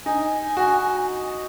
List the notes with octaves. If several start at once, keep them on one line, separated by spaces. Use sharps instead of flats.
D#4 G#5
F#4